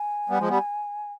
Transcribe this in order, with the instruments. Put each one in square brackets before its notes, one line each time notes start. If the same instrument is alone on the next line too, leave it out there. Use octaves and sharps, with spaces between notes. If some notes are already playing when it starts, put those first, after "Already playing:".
Already playing: [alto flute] G#5
[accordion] G3 B3
F3 G#3
G3 B3